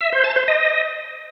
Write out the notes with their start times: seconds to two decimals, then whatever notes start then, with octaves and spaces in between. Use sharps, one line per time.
0.01 E5
0.12 C5
0.24 A5
0.36 C5
0.48 D#5